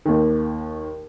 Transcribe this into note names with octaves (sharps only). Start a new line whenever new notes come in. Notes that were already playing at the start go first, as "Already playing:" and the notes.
D#2 D#3